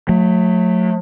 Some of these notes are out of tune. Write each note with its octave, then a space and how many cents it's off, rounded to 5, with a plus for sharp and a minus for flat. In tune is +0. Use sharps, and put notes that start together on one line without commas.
F#3 -40 A3 +0